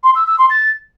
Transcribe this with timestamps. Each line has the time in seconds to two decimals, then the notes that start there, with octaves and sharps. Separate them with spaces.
0.04 C6
0.15 E6
0.27 E6
0.38 C6
0.50 A6